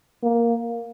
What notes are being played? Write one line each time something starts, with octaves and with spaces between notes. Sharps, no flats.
A#3